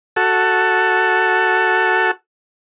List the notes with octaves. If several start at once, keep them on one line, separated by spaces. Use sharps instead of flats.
F#4 A4